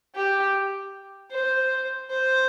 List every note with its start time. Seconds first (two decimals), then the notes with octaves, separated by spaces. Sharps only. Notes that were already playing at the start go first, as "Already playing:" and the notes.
0.15 G4
1.32 C5
2.11 C5